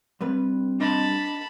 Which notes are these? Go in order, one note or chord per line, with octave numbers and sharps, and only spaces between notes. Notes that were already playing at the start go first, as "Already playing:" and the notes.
G2 G3 C4 B4
D4 D#5 A5 B5 C6